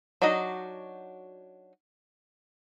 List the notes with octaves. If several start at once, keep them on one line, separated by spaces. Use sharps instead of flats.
F#3 D4 D#4 F#4 D#5